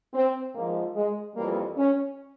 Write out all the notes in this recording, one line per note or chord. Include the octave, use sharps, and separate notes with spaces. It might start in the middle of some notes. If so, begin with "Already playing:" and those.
C4
G#2 F3 A#3
G#3
F2 E3 G3 A#3
C#4